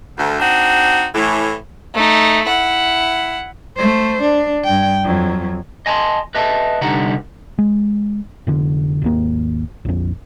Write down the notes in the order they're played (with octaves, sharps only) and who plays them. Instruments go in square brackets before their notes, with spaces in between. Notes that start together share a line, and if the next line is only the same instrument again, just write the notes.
[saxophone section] D2
C4 D4 D#4 F#4
A2 E3
[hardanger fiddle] A3 D#4
E4 F#5
[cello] A3 C5
D4
G2 G5
F2 F#3
[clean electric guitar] D#5 G#5 A5 B5 C6
B4 D#5 E5 A5
C2 D3 G3 D#4 F#5 A#5
[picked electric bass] G#3
F1 D3
G#1 D#2 A#3
A#1 F2